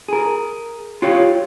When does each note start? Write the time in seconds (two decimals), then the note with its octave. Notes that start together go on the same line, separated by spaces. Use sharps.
0.08 G#4 A#4
1.02 F4 G4 C#5